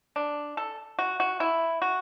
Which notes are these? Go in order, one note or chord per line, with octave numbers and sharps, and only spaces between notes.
D4
A4
F#4
F#4
E4
F#4